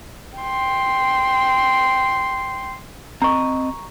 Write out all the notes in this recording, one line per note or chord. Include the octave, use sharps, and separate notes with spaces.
G5 C6
C4 D#5 A#5 C#6